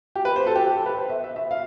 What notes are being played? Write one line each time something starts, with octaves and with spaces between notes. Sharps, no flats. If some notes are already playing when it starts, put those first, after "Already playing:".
G4
B4
C5
A4
G4
G4
A4
B4
C5
E5
E5
E5
F5